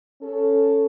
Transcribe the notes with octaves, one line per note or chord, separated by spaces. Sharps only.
C#4 A4